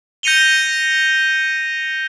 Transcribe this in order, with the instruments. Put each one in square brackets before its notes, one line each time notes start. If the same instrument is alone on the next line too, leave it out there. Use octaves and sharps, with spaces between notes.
[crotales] G6 A#6 C#7 D#7 F7 G7